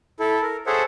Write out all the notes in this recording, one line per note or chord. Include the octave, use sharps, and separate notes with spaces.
E4 A4
A#4
G#4 A4 C5 C#5 E5 F#5